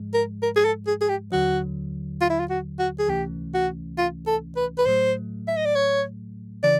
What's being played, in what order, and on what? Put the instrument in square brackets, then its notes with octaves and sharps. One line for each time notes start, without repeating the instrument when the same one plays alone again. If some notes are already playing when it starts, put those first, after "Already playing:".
Already playing: [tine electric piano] G#2 F3 G#3
[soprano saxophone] A#4
A#4
G#4
A4
G#4
G#4
G4
[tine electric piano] D#2 D3 F#3 [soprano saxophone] F#4
[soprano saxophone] F4
E4
F4
F#4
F#4
G#4
[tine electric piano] C#2 C3 E3 A3 C#4 [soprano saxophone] G4
[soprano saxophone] F#4
F4
A4
B4
B4
[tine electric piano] A2 F#3 A3 [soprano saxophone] C5
[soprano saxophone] E5
D#5
D5
C#5
[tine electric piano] C#3 E3 [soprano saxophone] D5